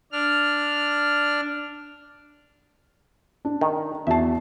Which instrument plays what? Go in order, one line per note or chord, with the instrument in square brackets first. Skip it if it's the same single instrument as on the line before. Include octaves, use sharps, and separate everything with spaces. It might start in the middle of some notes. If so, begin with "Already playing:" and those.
[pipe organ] D4 F6
[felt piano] D4
[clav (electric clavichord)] D#3
[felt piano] E2 F#4 C7 [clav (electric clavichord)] E5 A5